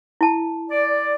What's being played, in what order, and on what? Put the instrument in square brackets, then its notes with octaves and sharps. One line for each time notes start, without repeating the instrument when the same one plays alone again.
[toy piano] E4 A5
[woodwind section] D5